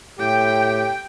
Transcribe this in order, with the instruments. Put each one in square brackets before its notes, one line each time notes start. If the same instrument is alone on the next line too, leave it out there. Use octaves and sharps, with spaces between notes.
[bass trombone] A2 [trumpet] G4 [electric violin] G5